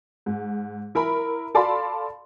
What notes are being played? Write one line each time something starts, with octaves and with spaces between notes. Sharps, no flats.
G#2
E4 A#4 A#5 B5
A4 D5 F5 A5 B5 C6